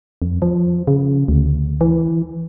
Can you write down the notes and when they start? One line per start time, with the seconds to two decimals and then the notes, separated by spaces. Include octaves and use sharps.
0.22 F2
0.42 F3
0.87 C#3
1.28 D2
1.81 E3